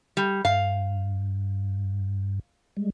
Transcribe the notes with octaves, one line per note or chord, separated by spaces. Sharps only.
G3
G2 F5
G3 G#3